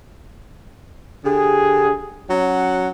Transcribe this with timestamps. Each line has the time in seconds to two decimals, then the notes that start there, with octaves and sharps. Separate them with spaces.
1.25 D3 G4 G#4
2.30 F#3 C#4 F#5